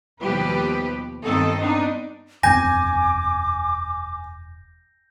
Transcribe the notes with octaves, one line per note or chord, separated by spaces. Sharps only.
D#2 B2 F3 G3 G4 B4
G2 D#3 B3 C4 A4 D#5
B3 C4 D4 D#4
E1 F#2 C4 G#5 D6 G6 A#6